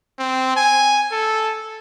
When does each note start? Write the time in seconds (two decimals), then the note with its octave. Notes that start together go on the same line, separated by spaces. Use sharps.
0.19 C4
0.56 G#5
1.12 A4